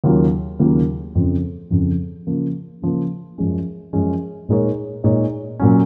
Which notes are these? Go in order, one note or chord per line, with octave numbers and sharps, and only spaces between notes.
D#2 C#3 F#3 A#3 F4
D#2 C#3 F#3 A#3 F4
F2 C#3 F3
F2 C#3 F3
C#3 F3 A#3
C#3 F3 A#3
F#2 F3 G#3 C#4
F#2 F3 G#3 C#4
A#2 G#3 D#4 A#4 C#5
A#2 G#3 D#4 A#4 C#5
A#2 F#3 C#4